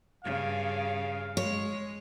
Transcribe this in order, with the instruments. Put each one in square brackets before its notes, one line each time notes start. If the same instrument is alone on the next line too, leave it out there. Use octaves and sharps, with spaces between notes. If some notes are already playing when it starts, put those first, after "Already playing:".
[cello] G2 C#3 [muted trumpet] F5
[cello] G#3 [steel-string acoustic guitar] C#5